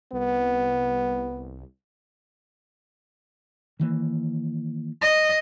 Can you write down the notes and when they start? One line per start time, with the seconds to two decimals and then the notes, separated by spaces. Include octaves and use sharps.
0.12 C2 B3
3.79 D#3 E3 A#3
5.02 D#5